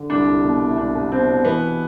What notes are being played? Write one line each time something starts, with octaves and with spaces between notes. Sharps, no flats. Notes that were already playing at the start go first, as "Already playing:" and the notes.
Already playing: D3
C2 D4
C2
B2
B2
E4
C2 D4
C2
B2 C4
B2
E3 B3